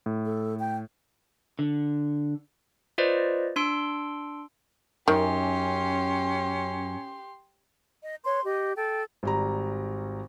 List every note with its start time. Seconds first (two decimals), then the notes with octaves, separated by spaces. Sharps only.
0.06 A2
0.25 A4
0.59 G5
1.59 D3
2.98 F4 B4 C5 D5 D#5
3.56 D4 C6 E6 D7
5.08 F#2 D#3 C#4 G4 C6
8.02 D#5
8.24 B4 C#5 C6
8.43 G4 D#5
8.76 A4 G5
9.23 G#1 G3 A#5